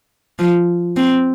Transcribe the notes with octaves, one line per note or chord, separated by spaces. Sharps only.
F3
C4